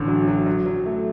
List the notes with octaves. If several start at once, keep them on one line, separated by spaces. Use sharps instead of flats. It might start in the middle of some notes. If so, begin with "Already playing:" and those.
Already playing: A1 D3
F#3
F#3
F#3
F#3
A3